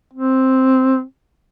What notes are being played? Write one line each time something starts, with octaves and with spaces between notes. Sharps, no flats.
C4